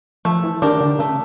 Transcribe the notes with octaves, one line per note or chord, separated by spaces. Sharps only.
F3 A3
E3
D#3 D4 G4 A#4
D3
C#3 A3